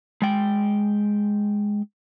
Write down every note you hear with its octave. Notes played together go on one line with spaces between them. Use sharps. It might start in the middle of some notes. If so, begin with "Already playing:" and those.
G#3 G5